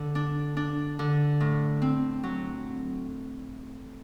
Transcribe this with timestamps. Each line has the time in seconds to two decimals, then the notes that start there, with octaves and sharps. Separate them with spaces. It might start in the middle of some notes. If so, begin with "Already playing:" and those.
Already playing: D3
0.15 D4
0.57 D4
0.99 D3
1.40 A2
1.82 C4
2.23 F#3